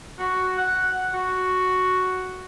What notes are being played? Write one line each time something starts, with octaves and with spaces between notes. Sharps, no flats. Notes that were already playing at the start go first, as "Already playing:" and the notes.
F#4
F#5
F#4